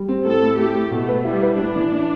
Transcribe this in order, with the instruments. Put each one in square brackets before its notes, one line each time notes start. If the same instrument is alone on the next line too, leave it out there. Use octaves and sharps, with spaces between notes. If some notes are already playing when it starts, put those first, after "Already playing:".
Already playing: [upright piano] G3
C4
[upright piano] A2 [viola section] A4
[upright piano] A2
[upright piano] A3 [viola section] G4
[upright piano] A2
[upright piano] B2 [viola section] A3
[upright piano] B4
[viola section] G3 [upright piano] E4
[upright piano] B4
[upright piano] A2 [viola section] D4
[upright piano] E3
E3